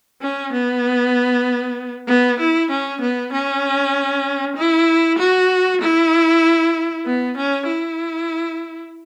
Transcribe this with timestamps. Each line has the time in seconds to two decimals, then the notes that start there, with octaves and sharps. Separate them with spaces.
0.22 C#4
0.53 B3
2.08 B3
2.40 E4
2.71 C#4
3.01 B3
3.33 C#4
4.56 E4
5.19 F#4
5.82 E4
7.06 B3
7.37 C#4
7.67 E4